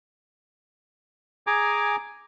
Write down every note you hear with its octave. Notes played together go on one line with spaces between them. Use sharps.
G#4 G#5 A#5 D6